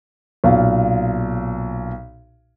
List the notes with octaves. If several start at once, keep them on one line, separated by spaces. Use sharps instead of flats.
B1 A#2 F5